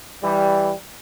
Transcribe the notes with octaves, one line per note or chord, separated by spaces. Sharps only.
E3 G3